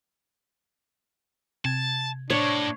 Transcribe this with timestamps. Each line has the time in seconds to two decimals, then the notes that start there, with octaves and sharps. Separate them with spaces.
1.65 C3 A5 G#6
2.30 A2 D4 C#5